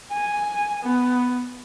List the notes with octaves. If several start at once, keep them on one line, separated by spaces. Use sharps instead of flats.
G#5
B3